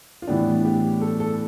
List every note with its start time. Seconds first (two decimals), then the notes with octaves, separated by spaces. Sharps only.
0.22 F4
0.27 A2 E3 G3 B3 D4 G4
0.65 G4
1.02 A4
1.20 A4